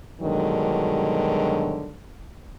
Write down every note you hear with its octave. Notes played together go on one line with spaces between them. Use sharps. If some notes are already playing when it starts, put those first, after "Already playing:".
G2 B2 D3 D#3 F#3 G#3